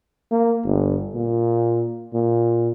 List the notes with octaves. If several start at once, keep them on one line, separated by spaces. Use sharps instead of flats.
A#3
G1
A#2
A#2